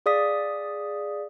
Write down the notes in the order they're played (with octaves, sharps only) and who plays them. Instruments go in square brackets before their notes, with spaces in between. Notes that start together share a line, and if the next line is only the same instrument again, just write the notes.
[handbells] G#4 D5 F5 D#6 B6